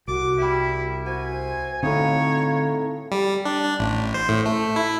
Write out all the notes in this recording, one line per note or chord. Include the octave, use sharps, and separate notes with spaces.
C2 F#4 D6
G3 E4 E5
F#4 C5 G#5
A2 D3 C4 D#4 C#5 F5
G3
D4
D4
A1
C5
A2
A3
E4